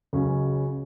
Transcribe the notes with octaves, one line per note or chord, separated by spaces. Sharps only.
C#2 C#3 F#3 C#4